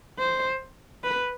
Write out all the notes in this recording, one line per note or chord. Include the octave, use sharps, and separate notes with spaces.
C5
B4